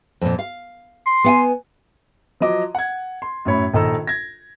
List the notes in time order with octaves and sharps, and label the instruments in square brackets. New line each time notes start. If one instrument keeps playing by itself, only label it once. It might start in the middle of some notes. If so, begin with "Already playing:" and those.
[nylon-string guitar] F2 A#2
F5
[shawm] C6
[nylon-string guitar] B3 F#5 G#5
[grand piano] F3 F#3 D#5 D6
F#5 G#6
C6
F#2 A2 C#5 B5
A#1 D#3 A4 D#5 A#5 E6
G#6 A#6